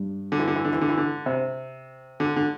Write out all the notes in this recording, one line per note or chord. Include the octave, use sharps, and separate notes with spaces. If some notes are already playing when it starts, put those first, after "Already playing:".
Already playing: G2 G3
D3
E3
D3
E3
D3
E3
D3
E3
D3
C3
D3
D3